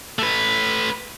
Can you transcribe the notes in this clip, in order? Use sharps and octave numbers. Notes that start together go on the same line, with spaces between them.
A3 B4